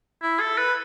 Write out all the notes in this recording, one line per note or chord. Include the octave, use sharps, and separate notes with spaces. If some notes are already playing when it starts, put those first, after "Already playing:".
E4
A4
B4